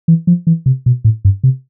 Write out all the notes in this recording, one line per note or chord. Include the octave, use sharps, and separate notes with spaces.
E3
F3
E3
C3
B2
A2
G2
C3